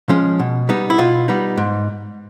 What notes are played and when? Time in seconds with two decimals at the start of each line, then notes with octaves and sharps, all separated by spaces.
0.09 F3 G#3 C#4
0.40 B2
0.69 G3 B3 D#4
0.90 E4
0.98 B2 F4
1.28 G3 B3 D#4
1.57 G#2